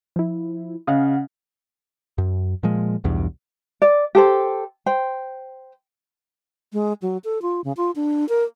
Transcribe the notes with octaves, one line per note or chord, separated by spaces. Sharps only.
F3 E4
C#3 D#5 F5 F#5
F#2
A#2 F3 G#3
B1 E2 G2
D5
G4 A4 C5
C5 G5
G#3
F#3
A4
F4
C#3
F4
D4
A#4